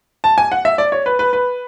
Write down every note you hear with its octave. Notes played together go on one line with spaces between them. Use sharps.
A5
G#5
F#5
E5
D5
C#5
B4
B4
B4